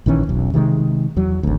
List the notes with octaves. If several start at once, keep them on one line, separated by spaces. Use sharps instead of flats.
A#1 D#3 E3 C#4
E1 B1
C3 D#3 F3 G#3
E2 F#3
G#1 D2